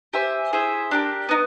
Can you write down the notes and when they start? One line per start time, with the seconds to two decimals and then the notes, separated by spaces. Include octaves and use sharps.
0.13 G4 C5 E5 G#5
0.53 E4 G#4 C5 E5
0.91 D4 G4 A#4
1.29 B3 D#4